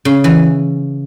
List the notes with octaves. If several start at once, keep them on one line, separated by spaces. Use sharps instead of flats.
C#3
E3